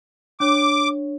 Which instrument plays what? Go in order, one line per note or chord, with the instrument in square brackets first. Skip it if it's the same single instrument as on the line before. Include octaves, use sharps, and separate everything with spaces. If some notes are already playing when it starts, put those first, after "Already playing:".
[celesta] D4 C#5 [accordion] D6